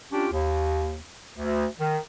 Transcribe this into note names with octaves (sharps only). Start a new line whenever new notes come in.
C#4 D4 F4 G4
D#2
D2
D#3